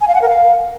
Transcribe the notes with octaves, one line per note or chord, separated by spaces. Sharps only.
G#5
F5
F#5
A#4
F5